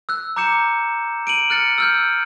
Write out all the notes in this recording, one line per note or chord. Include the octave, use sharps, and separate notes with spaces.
E6 F#6
A#5 D6 G6 C#7 E7
D7 D#7 F#7
F6 F#6 A6 C#7
E6 F6 G6